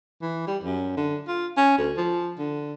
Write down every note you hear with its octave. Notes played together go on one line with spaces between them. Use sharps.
E3
G3
F#2
D3
F4
C#4
D2
F3
D3